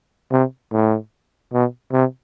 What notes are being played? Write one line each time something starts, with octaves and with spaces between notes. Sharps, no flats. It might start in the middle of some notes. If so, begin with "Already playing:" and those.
C3
A2
B2
C3